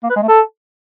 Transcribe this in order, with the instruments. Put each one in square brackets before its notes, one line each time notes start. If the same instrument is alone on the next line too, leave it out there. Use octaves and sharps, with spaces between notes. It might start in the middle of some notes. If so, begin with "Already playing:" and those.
[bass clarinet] A#3
B4
G#3
A3
A4